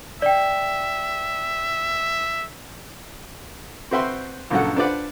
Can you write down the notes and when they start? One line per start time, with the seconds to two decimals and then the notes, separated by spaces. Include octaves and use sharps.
0.22 D5 E5 G5
3.91 C4 F#4 B4 E5 G5 C6
4.50 A#1 G2 C#3 F#3 A4 F#5
4.76 D4 F4 B4 C5 D5 F#5